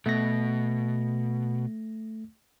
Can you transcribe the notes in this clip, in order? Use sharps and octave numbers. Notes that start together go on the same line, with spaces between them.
B2 A3 A#6